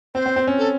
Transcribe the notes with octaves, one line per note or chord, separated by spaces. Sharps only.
C4 C5
C4
C4
C#4
A4